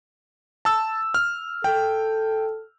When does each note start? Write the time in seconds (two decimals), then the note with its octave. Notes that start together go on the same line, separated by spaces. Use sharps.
0.65 A5 E6
1.14 F6
1.64 A4 G5